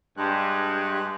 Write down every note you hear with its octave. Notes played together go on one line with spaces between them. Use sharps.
G2 G#3 F#6